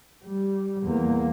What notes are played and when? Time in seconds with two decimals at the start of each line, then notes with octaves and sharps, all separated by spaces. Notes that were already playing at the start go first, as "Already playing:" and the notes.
0.25 G3
0.84 E2 A#3